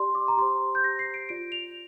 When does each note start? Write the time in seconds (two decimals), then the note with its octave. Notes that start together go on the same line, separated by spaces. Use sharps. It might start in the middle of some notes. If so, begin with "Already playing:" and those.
Already playing: G4 D5 C6
0.15 D6
0.28 A#5
0.37 G4 C5 C6
0.75 G6
0.84 G4 C5 A#6
0.99 C7
1.14 D7
1.29 F4 D5 D7
1.52 F7